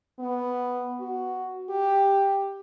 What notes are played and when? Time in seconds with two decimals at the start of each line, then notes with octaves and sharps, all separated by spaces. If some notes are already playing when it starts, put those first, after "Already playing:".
0.19 B3
1.00 F#4
1.70 G4